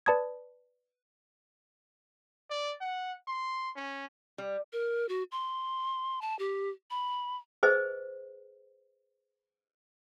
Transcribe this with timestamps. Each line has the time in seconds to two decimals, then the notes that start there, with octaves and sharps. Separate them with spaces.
0.06 B4 D5 A5 B5 D#6 G#6
2.50 D5
2.81 F#5
3.27 C6
3.76 C#4
4.38 G3
4.73 A#4
5.09 F#4
5.32 C6
6.22 A5
6.39 G4
6.91 B5
7.63 G#4 B4 C5 D#5